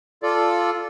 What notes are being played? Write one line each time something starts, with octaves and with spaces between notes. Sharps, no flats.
F4 A4 D5